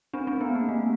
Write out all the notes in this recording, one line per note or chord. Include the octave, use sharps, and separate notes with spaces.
C4 D4
C4 D4
B3
A#3
A3